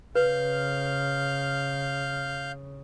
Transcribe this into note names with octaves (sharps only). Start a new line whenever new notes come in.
C#3 B4 F5 F6 G6